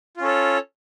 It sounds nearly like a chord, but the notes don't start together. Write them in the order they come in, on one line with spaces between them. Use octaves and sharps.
F4 C#4 A4 C#5